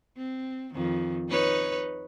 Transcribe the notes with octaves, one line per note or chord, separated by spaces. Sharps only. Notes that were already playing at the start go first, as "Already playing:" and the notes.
C4
F2 D#3
D#4 B4 C#5